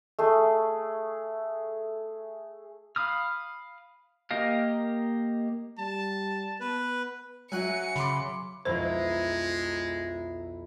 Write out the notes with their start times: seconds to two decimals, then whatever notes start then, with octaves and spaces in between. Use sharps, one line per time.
0.19 A3 G#4
2.96 F5 B5 D#6 F6
4.31 A#3 G4 D#5 F5
5.79 G3 A5
6.60 B3 B4
7.52 F#3 F#4 E5 G#5 F#6 C#7 D#7
7.96 C#3 B5 C6 D6
8.65 B1 F2 G#3 E4 C5 E5 A#5